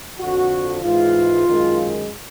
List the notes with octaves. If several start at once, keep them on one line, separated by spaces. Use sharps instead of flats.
F2 D3 F3 F#4
G#2 E3 G#3 F4
F#2 D#3 G#3